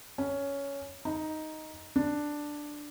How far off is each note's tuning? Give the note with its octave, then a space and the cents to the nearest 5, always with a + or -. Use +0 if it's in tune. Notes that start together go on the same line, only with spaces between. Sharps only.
C#4 +10
D#4 +5
D4 +5